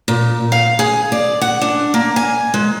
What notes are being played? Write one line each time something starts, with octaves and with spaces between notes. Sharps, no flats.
A#2
F5
G#4
D5
F#5
D4
A#3
G#5
G#3